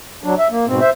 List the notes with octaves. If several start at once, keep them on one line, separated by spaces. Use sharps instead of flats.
F#3 D4
E5
A#3
G#2 B2 C4
C5 E5